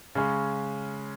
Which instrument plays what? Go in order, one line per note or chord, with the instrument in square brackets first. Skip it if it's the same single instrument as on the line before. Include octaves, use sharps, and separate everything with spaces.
[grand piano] C#3 G#3 C#4